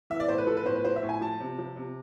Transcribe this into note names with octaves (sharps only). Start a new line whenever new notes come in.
E3 E5
D5
A2 C5
B4
F3 A4
B4
A2 C5
B4
F3 C5
E5
A2
G#5
F3 A5
C3
F3
C3